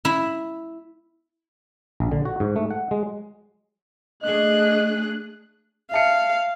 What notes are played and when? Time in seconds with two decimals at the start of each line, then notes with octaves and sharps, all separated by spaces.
0.05 E4
2.00 A#1
2.12 D3
2.25 F#4
2.40 G#2
2.56 A3
2.71 F#5
2.91 G#3
4.22 A3 D4 G#4 D#5 F#6
5.92 E5 F5 A5 C#7